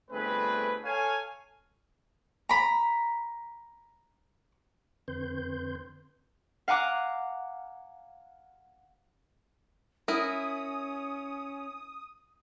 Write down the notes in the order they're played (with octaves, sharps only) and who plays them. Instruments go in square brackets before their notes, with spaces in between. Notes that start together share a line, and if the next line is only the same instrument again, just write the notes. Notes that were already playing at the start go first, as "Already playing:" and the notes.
[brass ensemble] G1 A3 C4 G#4 B4
A4 C#5 F5 G#5
[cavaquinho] A#5 B5
[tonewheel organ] F2 D3 C4 B4 C6 G6
[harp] F5 F#5 G#5 A#5 D6 F#6
[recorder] C#4 [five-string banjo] E4 A#4 [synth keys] D#6